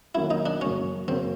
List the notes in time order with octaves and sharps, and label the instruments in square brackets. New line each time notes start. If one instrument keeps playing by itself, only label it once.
[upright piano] D#3 F#3 A#3 C#4 F#4 [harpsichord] E4
[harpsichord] D#4
D4
[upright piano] F#2 C#3 F#3 A#3 [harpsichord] C#4
[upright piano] F#2 C#3 F#3 A#3 [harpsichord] C4